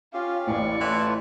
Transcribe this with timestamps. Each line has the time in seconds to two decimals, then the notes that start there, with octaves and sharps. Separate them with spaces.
0.14 C#4 F4 G4 F5
0.47 A1 A2 D5 C#6
0.81 E3 A3 F4 B4